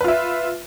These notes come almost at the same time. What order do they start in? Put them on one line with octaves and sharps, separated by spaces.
B4 F4 E5